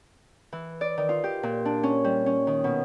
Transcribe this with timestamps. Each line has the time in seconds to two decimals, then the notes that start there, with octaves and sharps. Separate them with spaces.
0.53 E3
0.81 D5
0.98 D#3
1.09 F4
1.24 G4
1.43 A#2
1.65 D4
1.83 C#4
2.04 G3
2.26 C#4
2.47 D#3
2.64 B2